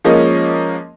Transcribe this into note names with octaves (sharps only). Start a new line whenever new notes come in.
F3 G#3 A#3 C#4 D#5